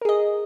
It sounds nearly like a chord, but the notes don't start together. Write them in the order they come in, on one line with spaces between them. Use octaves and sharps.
A#4 G#4 D#5